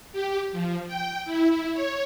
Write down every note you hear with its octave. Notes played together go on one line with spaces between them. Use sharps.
G4
F3
G5
E4
C#5